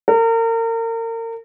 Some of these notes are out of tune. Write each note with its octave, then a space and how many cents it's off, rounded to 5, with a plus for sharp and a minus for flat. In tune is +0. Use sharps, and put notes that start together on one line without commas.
A#4 -35